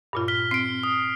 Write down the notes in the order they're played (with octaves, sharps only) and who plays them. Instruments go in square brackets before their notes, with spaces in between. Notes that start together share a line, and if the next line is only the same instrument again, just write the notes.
[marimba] G2 A#2 F4
[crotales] F6 B6 G7
[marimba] C4 [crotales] C7 D7
[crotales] D#6